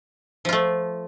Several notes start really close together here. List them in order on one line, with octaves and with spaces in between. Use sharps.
F3 F4 A3